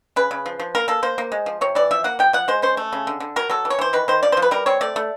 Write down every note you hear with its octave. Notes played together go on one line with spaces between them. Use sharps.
C#3 B4
C#3
F3
F3
A#3 A#4
A#3 A4
A#3 C5
A#3
G#3
F3
C3 C#5
E3 D5
F3 E5
A#3 F#5
F3 G5
F3 F#5
G#3 C5
C#4 C5
A3
C#3
D3
D3
F#3 A#4
F#3 A4
E3
C#5
E3 C5
D#3 B4
D#3 C5
F3 D5
C5
F3
B4
G3 A#4
C4 C#5
A3 D5
A3